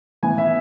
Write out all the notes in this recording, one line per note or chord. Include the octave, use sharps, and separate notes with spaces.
A2 E3 B3 G#5
E5